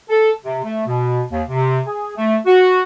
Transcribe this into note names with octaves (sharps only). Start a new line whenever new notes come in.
A4
C3
A3
B2
D#2
C3
G#4
A3
F#4